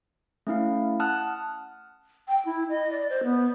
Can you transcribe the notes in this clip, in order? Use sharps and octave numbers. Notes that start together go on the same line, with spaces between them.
A3 C#4 E4 F5
F#5 A5 D#6 F6 F#6
G5
E4
D#5
D5
C5
B3